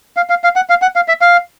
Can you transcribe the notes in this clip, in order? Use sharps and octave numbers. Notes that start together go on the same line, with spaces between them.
F5
F5
F5
F#5
F5
F#5
F5
E5
F5